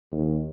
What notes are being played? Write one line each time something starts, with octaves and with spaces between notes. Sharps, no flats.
D#2